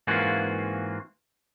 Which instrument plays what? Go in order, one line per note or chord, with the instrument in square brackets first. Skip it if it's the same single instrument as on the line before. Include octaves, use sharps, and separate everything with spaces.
[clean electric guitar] G#2 E3 A#3 C4 F4 F#4